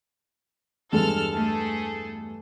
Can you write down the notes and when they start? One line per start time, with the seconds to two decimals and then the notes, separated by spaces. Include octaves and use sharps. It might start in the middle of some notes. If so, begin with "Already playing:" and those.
0.92 E2 G2 G#3 A4 F6
1.33 A3 G#4 A4